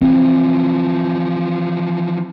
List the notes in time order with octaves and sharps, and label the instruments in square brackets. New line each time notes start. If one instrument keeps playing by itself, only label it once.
[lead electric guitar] E3 F3 [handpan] C4